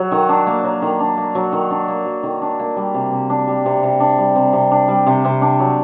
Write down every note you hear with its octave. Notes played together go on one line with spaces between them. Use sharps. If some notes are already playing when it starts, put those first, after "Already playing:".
Already playing: F#3
D#3
D4
A#3
F#3
D#3
D4
A#3
F#3
D#3
D4
A#3
F#3
D#3
D4
A#3
G3
C3
C3
D4
G3
C3
C3
D4
G3
C3
C3
D4
G3
C3
C3
D4
F#3